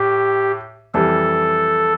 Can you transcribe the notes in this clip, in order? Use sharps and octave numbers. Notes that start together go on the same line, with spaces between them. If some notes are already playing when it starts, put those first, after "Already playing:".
Already playing: A2 G4
F2 E3 G3 A4